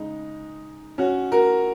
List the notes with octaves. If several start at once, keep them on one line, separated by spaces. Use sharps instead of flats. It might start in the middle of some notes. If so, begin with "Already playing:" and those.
Already playing: C#3 G#3 D#4
C#4 F#4
F#4 A#4